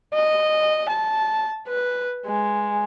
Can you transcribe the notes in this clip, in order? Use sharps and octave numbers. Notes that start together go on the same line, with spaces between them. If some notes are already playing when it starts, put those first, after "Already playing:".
D#5
A5
B4
G#3